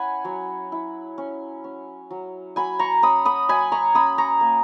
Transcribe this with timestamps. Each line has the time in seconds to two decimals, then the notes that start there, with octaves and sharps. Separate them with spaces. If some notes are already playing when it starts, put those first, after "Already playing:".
Already playing: C#4 E4 F#5 G#5 B5
0.25 F#3
0.72 E4
1.18 C#4
1.64 C#4
2.11 F#3
2.56 F#3 G#5 B5
2.79 A#5 C#6
3.02 C#4 B5 D#6
3.25 B5 D#6
3.49 F#3 G#5 B5
3.72 A#5 C#6
3.95 C#4 B5 D#6
4.18 A#5 C#6
4.41 A#3